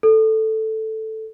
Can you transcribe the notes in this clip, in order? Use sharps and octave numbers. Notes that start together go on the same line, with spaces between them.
A4